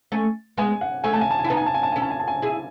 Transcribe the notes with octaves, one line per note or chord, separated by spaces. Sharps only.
A3 C#4
G#3 B3 G#5
F#5
A3 C#4 G#5
A5
G#5
A5
G#5
E4
B3 D#4 A5
G#5
A5
G#5
A5
C#4 E4 G#5
A5
G#5
A5
G#5
E4 G#4